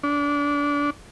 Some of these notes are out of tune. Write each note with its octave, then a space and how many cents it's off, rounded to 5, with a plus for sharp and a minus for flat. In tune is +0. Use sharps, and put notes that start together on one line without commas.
D4 -25